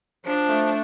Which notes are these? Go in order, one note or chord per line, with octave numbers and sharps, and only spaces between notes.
F3 D4
A3